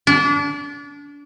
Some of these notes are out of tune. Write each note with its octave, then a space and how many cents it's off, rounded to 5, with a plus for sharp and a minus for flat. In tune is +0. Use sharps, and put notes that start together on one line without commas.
D4 -30